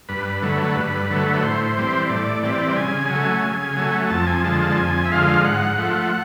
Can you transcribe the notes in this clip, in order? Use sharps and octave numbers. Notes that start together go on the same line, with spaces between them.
G2 B4
D3 F#3 A3
G2
D3 F#3 A3
B4
A2 C5
E3 G3 C4
A2 D5
E3 G3 C4 D5
C#3 G#5
F#3 A3
C#3
F#3 A3
F2 A5
G#5
D3 F3 G#3 A5
A5
F2 G#5
E5
D3 F3 G#3 F5
G#2 F#5
F3 A3